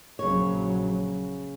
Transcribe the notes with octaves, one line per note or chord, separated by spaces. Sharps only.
A#1 C#3 F#3 C#5